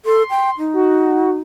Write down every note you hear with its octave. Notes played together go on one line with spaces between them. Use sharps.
A4 C6
G5
D#4
F#4